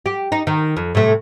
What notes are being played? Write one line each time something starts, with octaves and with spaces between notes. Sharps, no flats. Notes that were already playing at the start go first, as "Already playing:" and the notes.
G4
D#4
D#3
F2
A2 C3 A3